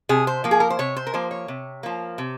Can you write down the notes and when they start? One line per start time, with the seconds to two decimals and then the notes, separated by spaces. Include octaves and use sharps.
0.09 C3 G#4
0.27 C5
0.44 F3 A#3
0.51 G#4
0.60 A#4
0.70 C5
0.79 C3 C#5
0.97 C5
1.07 A#4
1.14 F3 A#3 C5
1.31 C#5
1.48 C3
1.83 F3 A#3
2.18 C3